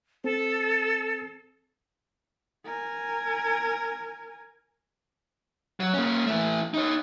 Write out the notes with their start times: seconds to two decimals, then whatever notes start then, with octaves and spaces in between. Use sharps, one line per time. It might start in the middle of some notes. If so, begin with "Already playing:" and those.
0.24 C4 A4
2.65 A#4 G#5
5.80 F#3
5.94 A#3 C#4
6.26 E3 A3
6.74 D#4 C#5